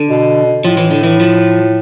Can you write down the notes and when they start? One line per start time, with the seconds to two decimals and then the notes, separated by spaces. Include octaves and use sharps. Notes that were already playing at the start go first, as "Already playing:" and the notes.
Already playing: D3
0.09 B2
0.65 A2 F3
0.77 E3
0.91 D3
1.04 E3
1.20 F3